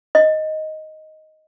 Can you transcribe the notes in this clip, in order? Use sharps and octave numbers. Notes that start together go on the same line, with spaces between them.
D#5